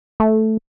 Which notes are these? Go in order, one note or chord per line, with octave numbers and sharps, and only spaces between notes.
A3